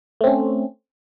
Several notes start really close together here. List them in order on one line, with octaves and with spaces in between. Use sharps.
A3 C4 C#4